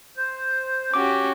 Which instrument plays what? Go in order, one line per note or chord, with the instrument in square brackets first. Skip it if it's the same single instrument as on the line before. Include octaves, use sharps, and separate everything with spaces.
[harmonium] C5
[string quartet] C#4 F#4 G4 [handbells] D6